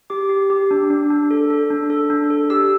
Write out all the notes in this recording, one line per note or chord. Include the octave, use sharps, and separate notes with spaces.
G4 D6
G4
G4
D4
D4
D4
A4
A4
D4
A4
D4
A4
G4 E6